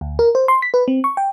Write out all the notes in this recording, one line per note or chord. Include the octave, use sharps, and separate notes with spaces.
D2
A#4
C5
C6
B6
B4
C4
C#6
G5